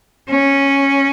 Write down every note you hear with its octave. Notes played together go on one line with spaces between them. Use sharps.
C#4